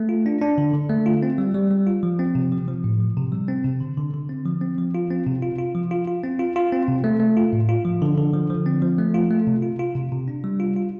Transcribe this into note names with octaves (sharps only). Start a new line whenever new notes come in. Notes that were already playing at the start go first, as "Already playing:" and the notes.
Already playing: A3
F4
D4
D4
D3
D3
A3
F4
C4
G3
G3
G3
F4
F3
C4
C3
F3
F3
A2
F3
C3
G3
C4
C3
D3
D3
D3
C4
F3
C4
F3
F4
C4
C3
F4
F4
F3
F4
F4
C4
F4
F4
C4
C3
A3
A3
F4
A2
F4
F3
D3
D3
F3
F3
C4
F3
A3
F4
A3
C3
F4
F4
C3
C3
D4
G3
F4
F4